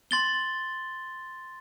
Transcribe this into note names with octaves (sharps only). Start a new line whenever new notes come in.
C6 A6 G7